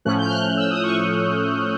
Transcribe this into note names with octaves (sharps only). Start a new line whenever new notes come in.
A2 F3 A3 C#4 F#6
G6
F6
F#6
E6
D#6
C#6